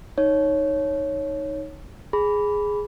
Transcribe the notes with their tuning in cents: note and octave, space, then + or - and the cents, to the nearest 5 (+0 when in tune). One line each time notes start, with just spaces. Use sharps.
D#4 +0 C#5 +0
G#4 +0 B5 +0